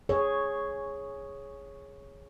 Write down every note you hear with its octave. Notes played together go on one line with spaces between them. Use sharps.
G#4 C#5